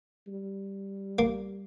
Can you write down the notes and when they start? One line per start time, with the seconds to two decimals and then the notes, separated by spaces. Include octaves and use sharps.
0.28 G3
1.19 A#3